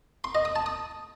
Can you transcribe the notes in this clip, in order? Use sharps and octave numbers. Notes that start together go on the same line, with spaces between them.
C6
D#5
D#6
A5
D#6